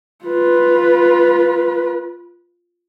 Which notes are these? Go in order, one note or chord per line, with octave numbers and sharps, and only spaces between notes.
F4 B4